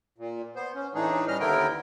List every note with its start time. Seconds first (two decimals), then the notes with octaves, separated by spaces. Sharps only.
0.18 A#2
0.56 B3 C5
0.75 C#4
0.95 A2 E3 A3 D4 D#4 G#4
1.28 G3 C#4 D#5 F6
1.40 D#2 D3 B3 E4 A#4 G5